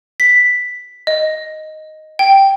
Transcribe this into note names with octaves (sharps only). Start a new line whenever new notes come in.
B6
D#5
G5